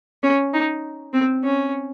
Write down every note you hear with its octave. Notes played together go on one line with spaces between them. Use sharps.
C#4
D#4
C4
C#4